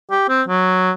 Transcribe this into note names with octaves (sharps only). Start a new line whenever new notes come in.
G4
C4
F#3